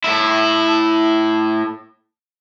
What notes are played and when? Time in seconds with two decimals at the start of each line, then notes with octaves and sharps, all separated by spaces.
0.04 A2 E4